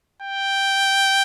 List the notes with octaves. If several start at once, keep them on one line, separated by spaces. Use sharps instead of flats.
G5